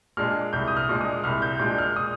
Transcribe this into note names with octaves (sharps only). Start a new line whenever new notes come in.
A#2 G#3 D4 F6
C2 G6
D#6
F6
A#2 G#3 D4
D#6
C2 F6
G6
A#2 G#3 D4 G6
F6
D#6